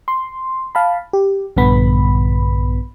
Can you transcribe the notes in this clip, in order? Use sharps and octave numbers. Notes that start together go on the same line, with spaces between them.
C6
F5 A5 B5
G4
A#1 G2 D3 B3 B5